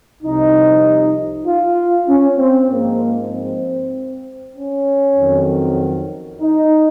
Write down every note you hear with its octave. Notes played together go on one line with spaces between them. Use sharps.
C2 C3 F3 D#4
F4
C#4
C4
G#2 F3 G#3 A#3
C4
C#4
F2 D#3 F#3
D#4